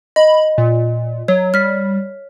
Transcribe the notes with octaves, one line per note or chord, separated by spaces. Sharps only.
D#5 B5
A#2
F#3 C#5
G3 F6 B6